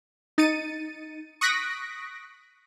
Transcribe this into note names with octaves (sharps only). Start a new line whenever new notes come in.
D#4 A6 C#7 D#7
C#6 D#6 F#6 A#6 B6 D7